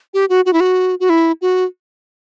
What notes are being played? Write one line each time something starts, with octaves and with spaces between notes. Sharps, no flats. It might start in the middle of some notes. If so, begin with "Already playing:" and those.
G4
F#4
F#4
E4
F#4
F#4
E4
F#4